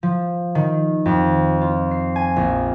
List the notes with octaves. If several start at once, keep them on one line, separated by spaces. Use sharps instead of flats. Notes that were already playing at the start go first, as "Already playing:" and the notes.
F3
D#3
F2
F4
C7
G#5
A#1